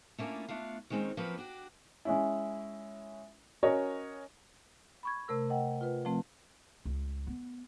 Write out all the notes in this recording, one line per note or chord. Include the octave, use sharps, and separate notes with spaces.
A3 A#3 C#4 D4 E4 F4
A3 B3 D4 F4
D#3 G3 G#3 C4 C#4 D#4
F3 F#3 A#3 C4 C#4 B4
D4 F#4 G4
G#3 C#4 E4
C#4 F#4 A#4 C#5 D#5
B5 C#6 G#6
C3 A3 A#4 E6
D#5 F#5 G5
F4 B4
F3 A3 C4
C#2
B3